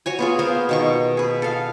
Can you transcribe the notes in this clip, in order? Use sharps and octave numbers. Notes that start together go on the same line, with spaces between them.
F#4 C#5 G#5
B3 F4 G#4
B3 A#4 C5 F5
B2 D#3 C#6
G#4 B4
A4 F5